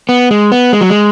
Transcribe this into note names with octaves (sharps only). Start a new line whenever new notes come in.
B3
G#3
B3
G#3
F#3
G#3